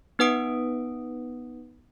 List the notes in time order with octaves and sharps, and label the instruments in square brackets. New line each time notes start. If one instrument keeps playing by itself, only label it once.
[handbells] B3 D#4 B4 F#5 D#6 D7